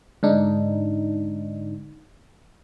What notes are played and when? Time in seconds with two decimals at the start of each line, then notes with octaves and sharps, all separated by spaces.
0.23 G#2 D3 D4 D#4